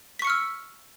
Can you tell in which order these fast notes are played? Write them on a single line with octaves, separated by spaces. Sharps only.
B6 C#6 C#7 F6 E6